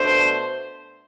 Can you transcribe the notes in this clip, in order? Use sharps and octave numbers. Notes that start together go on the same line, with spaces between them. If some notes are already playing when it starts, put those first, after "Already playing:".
Already playing: B2 A3 D4 C5